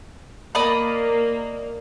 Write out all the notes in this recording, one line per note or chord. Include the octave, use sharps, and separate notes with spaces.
A#3 D5 D#5 B5